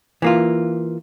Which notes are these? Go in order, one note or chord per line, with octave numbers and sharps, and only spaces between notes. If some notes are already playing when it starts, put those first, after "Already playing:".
E3 A#3 F4